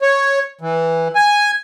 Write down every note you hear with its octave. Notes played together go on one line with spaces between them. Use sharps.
C#5
E3
G#5